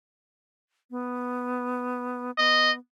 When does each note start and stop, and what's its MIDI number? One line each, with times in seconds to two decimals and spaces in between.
0.91 2.31 59
2.38 2.78 59
2.38 2.71 75